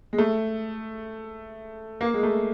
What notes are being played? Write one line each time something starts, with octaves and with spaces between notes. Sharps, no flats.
G#3
A3
A#3
G#3
A3